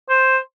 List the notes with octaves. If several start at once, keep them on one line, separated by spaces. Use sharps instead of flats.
C5